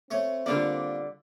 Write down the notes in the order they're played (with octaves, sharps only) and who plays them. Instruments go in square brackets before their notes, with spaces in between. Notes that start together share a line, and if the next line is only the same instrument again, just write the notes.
[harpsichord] A3 C#5 [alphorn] C4
[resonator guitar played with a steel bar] D3 G3 D5 [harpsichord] A#3 F4